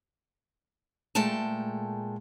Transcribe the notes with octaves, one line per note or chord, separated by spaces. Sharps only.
A#2 G#3 A3 G5 A5